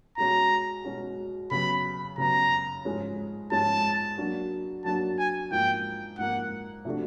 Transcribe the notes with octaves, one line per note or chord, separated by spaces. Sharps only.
B2 G#3 C#4 F#4 A#5
B2 G#3 C#4 F#4
C#3 F#3 B3 B5
C#3 F#3 B3 A#5
G#2 F3 G#3 C#4
G#2 F3 G#3 C#4 A5
F#3 A#3 D4 F#4
F#3 A#3 D4 F#4 A5
G#5
G#2 F3 A#3 G5
G#2 F3 A#3 F#5
C3 F3 A3 D4 F#4